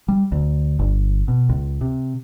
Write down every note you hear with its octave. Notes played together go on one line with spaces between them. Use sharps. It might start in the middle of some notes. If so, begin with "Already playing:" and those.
G3
D2
G1
B2
C#2
C3